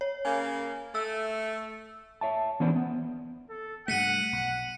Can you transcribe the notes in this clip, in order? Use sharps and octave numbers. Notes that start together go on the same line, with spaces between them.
C#5
C#3 A#3 G#5
A3 E6
C#5 E5 A5
E3 B3 C#4 D4 C5 D5
B3
A4
G2 C3 A3 F#5 B6 C#7 D#7
B1